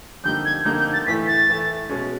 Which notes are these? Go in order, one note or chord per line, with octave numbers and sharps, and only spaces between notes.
F2 D3 G3 A#3 D#4 G6
G#6
F2 D3 G3 A#3 D#4 G6
G6
A6
A2 E3 A3 B6
A6
A2 E3 A3
B2 G#3 C#4